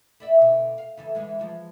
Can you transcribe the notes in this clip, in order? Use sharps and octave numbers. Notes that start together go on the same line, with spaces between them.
E4 D5 E5
B2 D3
F5
C#3 E3 A4
D3 E3 G#3
E3 F3 G#3